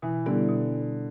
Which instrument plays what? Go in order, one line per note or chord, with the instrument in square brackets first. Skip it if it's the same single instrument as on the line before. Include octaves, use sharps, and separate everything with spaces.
[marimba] B2 [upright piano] E3
[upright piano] D3 [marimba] G3 B3 E4 G4
[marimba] B2